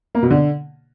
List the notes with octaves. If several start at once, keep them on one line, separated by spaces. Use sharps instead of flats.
A#3
B2
D3